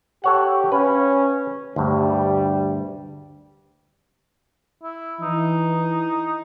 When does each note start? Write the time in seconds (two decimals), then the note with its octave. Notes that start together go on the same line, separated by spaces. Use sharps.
0.24 G4 A4 C#5 F#5
0.72 C#4 B4 F5
1.76 D2 G2 G3
4.83 E4
5.21 E3 D#4